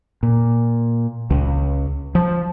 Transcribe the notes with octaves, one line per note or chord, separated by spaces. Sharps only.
A#2
C#2
F3